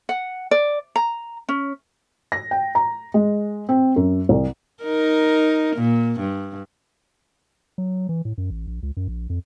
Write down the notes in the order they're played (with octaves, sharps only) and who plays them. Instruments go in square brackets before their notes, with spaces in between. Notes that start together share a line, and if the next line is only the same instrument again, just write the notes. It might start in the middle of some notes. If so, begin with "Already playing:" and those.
[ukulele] F#5
D5
A#5
C#4
[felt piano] A#6
G5
A#5
G#3
C4
F#2
C2
[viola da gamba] D#4 A#4
A#2
G2
[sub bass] F#3
E3
A2
F#2
A1
A#1
C#2
F#2
A#1
F2